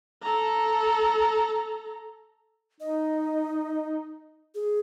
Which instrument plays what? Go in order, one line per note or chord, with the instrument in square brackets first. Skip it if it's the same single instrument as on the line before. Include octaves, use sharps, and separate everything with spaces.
[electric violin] A4 A#5
[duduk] D#4 [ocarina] D#5
[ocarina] G#4